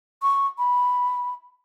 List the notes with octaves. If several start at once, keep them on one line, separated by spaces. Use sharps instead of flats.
C#6
B5